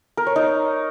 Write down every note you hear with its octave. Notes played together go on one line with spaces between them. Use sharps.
A#4
C#5
D#4